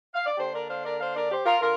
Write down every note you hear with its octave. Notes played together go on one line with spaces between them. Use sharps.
F5
D5
D3 A#3 D4 G4 C5
A#4 D5
C5 F5
A#4 D5
C5 F5
A#4 D5
G4 C5
F4 A#4
D3 F4 A#4